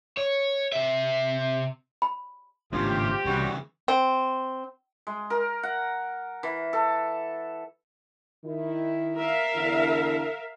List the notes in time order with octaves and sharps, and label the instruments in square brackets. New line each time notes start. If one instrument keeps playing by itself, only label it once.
[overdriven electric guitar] C#5
C3 E5
[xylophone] B5
[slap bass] G#1 B3 D4 [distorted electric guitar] A2 C#3 [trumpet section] C4 G4 [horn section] F4
[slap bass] C2 [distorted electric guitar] C#3 E3 [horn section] G3 F#4
[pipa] C4
[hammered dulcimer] G#3
A#4
F#5
E3
A4
[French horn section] D#3 E4
[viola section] A#4 E5 F5
[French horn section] E2 D3 E4